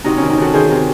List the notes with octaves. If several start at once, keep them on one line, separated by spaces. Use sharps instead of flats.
C3 D#4 F#4
D#3 C#4
D#4
D#3 F#4 A4
D#3 G#4 C5
C3